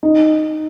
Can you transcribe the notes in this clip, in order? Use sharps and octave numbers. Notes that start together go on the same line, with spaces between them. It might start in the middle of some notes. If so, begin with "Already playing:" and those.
D#4